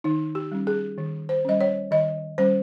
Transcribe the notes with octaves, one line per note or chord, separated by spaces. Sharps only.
D#3 D#4
G4
G3 C#4
G#4
D#3
C5
G3 C#4 D#5
C#5
D#3 D#5
G3 C#4 C5